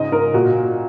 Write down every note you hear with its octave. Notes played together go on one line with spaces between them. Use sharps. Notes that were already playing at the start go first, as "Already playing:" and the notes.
Already playing: G#2 C#3 D#5
G#2 A#4
A#2 F#4